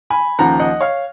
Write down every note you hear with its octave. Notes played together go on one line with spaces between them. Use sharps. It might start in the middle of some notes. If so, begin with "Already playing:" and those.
G#5 B5
D#2 C#3 F3 F#5 A#5
D#5 F#5
C#5 F5